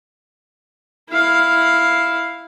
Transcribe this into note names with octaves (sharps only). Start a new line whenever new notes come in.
E4 F5